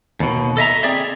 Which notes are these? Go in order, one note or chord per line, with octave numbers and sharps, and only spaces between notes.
D#2 B2
A4 D#5 E5 A#5
C4 G#4 D5 E5